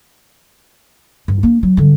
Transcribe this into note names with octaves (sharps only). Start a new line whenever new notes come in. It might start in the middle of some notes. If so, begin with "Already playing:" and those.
G2
A#3 D4
F#3
G2 D3